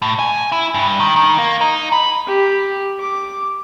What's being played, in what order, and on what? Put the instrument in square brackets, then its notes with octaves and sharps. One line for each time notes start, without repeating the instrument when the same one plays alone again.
[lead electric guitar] A2
G#5
E4
G2
D#3
D#3
A#3
D#4
B5
[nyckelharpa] G4
D6